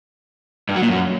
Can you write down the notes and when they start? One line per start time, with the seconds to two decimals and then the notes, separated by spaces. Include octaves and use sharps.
0.69 G2
0.75 F#3
0.82 A#2
0.89 F#2